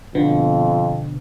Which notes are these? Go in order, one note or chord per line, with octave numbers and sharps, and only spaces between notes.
F2 B2 D3 B3